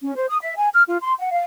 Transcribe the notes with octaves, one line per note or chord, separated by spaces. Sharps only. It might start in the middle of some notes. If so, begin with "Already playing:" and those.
C#4
C5
D#6
E5
G#5
F6
F4
C6
F#5
F5